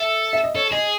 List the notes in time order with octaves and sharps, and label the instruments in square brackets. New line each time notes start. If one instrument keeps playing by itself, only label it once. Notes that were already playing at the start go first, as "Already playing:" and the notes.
Already playing: [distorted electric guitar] A4 [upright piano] E5
[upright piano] E5
D#5
[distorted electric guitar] A4 [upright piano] C#5
[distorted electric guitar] G#4 [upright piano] D#5